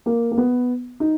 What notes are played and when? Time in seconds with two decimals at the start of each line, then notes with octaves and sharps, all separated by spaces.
0.06 A#3
0.31 A#3
0.37 B3
1.00 D#4